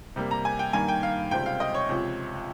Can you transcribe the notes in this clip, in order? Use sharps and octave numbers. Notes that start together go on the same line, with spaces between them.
C3 G3 A#3
A#5
G#5
G5
G2 D#3 A#3 G#5
G5
F5
C#2 C3 G3 C4 G5
F5
D#5
C#5
C#2 C3 F3